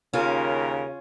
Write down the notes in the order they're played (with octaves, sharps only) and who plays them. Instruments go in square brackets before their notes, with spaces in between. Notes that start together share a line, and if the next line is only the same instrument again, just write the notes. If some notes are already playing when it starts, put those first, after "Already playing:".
[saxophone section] D#2 A#4 [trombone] C#3 [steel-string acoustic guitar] C#4 F4